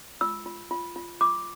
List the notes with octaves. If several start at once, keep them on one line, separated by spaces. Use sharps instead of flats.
F4 E6
F4
F4
F4
F4 D6